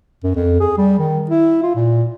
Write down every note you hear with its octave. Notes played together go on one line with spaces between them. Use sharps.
F#2
F2
G#4
G3
D#3
E4
F4
A#2